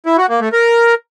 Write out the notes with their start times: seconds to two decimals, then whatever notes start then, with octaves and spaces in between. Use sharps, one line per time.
0.06 E4
0.18 F#4
0.29 A#3
0.41 A3
0.52 A#4